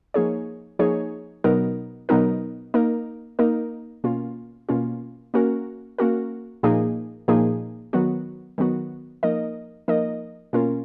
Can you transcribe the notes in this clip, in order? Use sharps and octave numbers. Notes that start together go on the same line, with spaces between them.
F3 A#3 D#4 G#4 C#5
F3 A#3 D#4 G#4 C#5
B2 F#3 B3 D#4 A#4
B2 F#3 B3 D#4 A#4
A#3 D#4 A#4
A#3 D#4 A#4
B2 A#3 C#4 F4
B2 A#3 C#4 F4
A#3 C#4 F#4 A#4
A#3 C#4 F#4 A#4
A#2 F3 A#3 D#4 G#4
A#2 F3 A#3 D#4 G#4
D#3 F#3 B3 F#4
D#3 F#3 B3 F#4
F3 A#3 D#4 A#4 D#5
F3 A#3 D#4 A#4 D#5
B2 A#3 C#4 F4 A#4